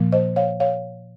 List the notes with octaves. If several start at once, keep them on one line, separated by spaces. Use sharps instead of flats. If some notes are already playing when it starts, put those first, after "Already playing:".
Already playing: A#2 F3 A#3
C5 D#5
C#5 F5
C#5 F5